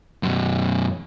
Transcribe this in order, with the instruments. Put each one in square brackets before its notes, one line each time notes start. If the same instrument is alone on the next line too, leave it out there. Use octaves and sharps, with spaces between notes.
[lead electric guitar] F#2 B2